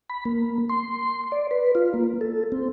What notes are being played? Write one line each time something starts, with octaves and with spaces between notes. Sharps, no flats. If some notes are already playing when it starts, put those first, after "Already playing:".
B5
A#3
C6
D5
B4
F4
A#3
A4
C4